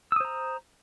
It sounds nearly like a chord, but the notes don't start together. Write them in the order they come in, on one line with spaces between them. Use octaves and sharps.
E6 D#6 C5 A#5